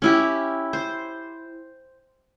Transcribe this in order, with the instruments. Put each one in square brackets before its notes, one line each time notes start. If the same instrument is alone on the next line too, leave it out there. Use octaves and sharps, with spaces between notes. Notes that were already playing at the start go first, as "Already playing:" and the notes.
[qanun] C#4 E4 G4
C5